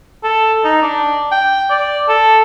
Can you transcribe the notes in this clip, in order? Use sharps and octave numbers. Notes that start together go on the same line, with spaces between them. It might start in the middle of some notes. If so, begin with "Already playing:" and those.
A4
D#4
D4
G5
D5
A4